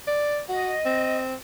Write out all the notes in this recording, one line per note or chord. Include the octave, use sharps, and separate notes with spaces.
D5
F#4 D#5
C4